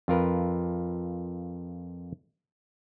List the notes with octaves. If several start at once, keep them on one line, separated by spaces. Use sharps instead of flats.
F2 F4 A#4 B4